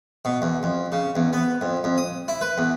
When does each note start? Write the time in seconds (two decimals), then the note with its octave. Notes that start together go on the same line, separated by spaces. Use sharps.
0.25 B2
0.42 E2
0.63 F2
0.92 C#3
1.15 E2
1.33 B3
1.61 F2
1.84 F2
1.98 D#6
2.28 E4
2.41 B4
2.58 E2